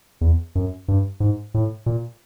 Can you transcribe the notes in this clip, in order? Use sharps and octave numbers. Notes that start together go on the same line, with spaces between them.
E2
F#2
G2
G#2
A2
A#2